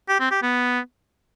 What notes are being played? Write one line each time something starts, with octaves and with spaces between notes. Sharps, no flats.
G4
C4
G4
B3